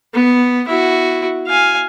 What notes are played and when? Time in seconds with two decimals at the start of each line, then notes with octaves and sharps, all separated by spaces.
0.14 B3
0.68 E4 F#4
1.47 F5 G#5